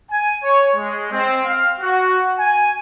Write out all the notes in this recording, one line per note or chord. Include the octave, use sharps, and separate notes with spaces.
G#5
C#5
G#3
C4
F5
F#4
G#5